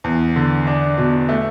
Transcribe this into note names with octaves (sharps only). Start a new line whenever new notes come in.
E2
D3
D4
B2
A3